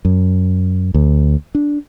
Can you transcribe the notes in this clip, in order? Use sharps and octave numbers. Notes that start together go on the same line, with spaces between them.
F#2
D2
D4